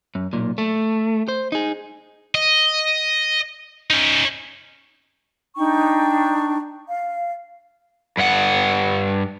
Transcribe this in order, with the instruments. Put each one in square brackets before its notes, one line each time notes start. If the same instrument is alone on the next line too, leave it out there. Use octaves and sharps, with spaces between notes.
[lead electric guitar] F#2
B1 A#2
A3
C5
D#4 G#4
[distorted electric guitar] D#5
C#4 D#4
[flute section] D4 D#4 G5 C#6
F5
[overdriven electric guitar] G2 F#5